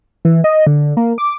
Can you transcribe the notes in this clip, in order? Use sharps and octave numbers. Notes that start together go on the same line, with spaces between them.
E3
D#5
D3
A#3
D6